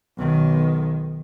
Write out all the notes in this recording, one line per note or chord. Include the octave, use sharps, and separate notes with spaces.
B1 D#3